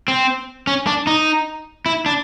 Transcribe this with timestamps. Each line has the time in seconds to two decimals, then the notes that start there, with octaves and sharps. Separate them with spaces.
0.08 C4
0.67 C#4
0.87 D4
1.07 D#4
1.86 E4
2.06 D4